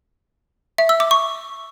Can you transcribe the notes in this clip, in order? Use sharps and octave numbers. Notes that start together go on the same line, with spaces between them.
E5
E6
D6
C#6